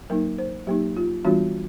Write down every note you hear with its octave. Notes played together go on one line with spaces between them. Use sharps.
F#3 A#3 D#4 A#4
C5
F#3 A#3 D#4 G4
F4
E3 G3 B3 D4 F4 F#4